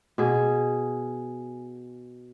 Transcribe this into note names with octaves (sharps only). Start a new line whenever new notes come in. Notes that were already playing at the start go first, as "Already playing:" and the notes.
B2 G#4